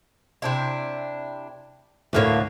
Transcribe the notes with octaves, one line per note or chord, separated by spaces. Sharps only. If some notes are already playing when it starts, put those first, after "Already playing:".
C3 D4 E4
D2 A2 D3 A#3 B4 C#5